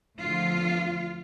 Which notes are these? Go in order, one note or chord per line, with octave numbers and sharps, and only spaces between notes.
E2 D3 F3 A3 F4